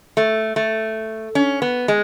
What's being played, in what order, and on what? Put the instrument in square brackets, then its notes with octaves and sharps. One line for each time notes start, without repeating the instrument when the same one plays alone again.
[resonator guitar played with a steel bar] A3
A3
C#4
B3
G#3